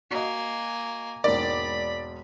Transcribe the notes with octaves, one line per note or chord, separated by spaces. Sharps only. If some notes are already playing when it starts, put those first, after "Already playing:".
A#3 F#4 D#5 G#5
E1 G#2 A#3 D5 B5